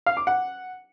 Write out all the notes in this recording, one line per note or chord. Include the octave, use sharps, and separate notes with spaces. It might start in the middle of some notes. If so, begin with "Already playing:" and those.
F5
D6
F#5